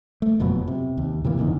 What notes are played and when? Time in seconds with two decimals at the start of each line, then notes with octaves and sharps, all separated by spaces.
0.22 A3
0.40 F#1 F2 B2 F#3
0.67 C3
0.97 D#2
1.24 C3 E3 A#3
1.37 F#1 E2 D3 D#3